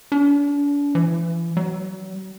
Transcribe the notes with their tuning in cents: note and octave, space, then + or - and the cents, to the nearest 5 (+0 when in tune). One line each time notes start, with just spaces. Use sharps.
D4 -40
E3 +35
F#3 +40